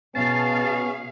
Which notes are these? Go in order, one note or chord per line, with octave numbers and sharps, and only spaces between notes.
B2 B3 C#4 G#4 F5 A5